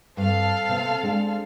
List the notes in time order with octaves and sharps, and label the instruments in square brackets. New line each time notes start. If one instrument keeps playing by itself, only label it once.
[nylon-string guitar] G2 [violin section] C4 A4 F5
[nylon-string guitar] C3 B3
G#3 D4